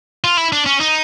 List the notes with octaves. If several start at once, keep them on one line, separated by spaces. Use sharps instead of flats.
F4
E4
D4
C#4
D#4